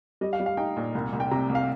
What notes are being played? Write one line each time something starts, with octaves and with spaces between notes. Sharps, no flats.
G3 D#5
F5
G3
F5
D#4 G5
A#2
C2
C2
G5
C3 A#5
C2
F5